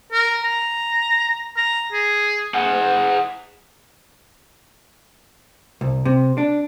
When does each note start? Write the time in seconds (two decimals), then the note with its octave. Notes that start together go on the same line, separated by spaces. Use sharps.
0.12 A#4
0.44 A#5
1.57 A#5
1.92 G#4
2.54 G#4 F#5
5.81 C2
6.05 C3
6.38 D4